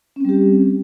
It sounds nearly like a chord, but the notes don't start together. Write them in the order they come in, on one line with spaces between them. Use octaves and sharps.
C#4 C4 G3 G4